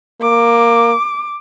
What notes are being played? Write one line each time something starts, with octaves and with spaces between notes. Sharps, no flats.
A#3 D6